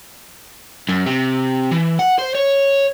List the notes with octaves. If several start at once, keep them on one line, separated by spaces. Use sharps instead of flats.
F#2
C3
E3
F#5
C5
C#5